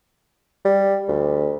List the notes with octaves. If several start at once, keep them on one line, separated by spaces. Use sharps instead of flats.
G3
D2